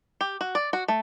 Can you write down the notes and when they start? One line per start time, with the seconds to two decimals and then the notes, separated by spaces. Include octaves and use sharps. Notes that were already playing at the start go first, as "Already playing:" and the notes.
0.21 G4
0.41 F#4
0.55 D5
0.73 F#4
0.88 A3